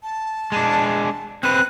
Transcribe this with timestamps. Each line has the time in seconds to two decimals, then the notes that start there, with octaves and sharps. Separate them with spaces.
0.03 A5
0.52 G#3 D4
1.43 C4 B4 F#6